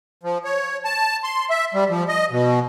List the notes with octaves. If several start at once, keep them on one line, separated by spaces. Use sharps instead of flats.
F3
C#5
A5
C6
E5
G3
F3
D#5
B2